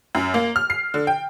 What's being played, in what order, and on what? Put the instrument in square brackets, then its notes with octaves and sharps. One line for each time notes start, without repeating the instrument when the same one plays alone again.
[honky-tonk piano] F#2
A#3
F6
C7
D3
G5